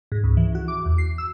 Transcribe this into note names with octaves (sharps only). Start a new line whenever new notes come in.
G#2
C#2
E3
F#4
D6
E2
C7
E6